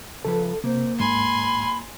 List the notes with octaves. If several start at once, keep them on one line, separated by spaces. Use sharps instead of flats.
C#3 F3 A4 B4
C3 A#3 C5
D#2 G#2 G#5 B5 C6